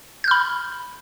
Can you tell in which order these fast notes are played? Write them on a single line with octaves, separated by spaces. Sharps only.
G6 F6 B5